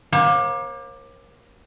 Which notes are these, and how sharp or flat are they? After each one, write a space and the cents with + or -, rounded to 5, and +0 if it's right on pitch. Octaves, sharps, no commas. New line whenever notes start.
A#3 +25 C#5 -45